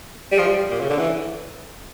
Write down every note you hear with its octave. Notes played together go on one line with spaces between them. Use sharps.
G3
F3
G3
A#2
C#3
D3
E3